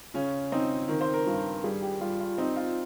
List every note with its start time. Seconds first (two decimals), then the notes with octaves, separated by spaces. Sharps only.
0.14 C#3 C#4
0.52 C4 D#4
0.88 D#3 A#4
1.01 C5
1.14 A#4
1.26 G2
1.64 G3 G#4
1.82 G4
2.01 G3 F4
2.20 F4
2.38 C4 D#4
2.56 F4